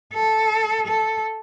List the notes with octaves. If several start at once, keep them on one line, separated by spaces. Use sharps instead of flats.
A4
A4